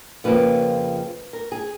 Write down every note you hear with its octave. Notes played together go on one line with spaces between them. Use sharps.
F2 C#3 F3 A#3 B4
A#4
G#4